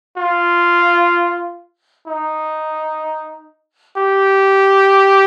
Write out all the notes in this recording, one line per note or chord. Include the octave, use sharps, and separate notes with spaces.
F4
D#4
G4